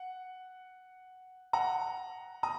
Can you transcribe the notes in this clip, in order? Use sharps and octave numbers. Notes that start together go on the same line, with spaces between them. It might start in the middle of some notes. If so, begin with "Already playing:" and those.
Already playing: F#5
F#5 A#5
A#5 D#6